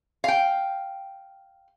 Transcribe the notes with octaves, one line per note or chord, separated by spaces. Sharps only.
F5 G5